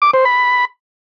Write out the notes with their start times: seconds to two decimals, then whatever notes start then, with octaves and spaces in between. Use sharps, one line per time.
0.02 D6
0.13 C5
0.25 B5